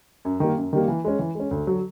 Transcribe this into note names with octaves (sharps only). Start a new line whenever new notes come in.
F#2
D#3 G3 A#3
F#2
D#3 G3 A#3
E3
G#3 C#4
E3
G#3 C#4
D2
D3 F#3